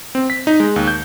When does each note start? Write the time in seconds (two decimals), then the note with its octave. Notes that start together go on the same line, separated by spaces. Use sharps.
0.15 C4
0.30 B6
0.47 D#4
0.60 G#3
0.76 D#2
0.88 G6